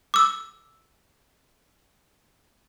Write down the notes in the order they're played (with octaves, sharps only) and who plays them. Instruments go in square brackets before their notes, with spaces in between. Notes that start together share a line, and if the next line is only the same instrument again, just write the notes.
[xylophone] D6 E6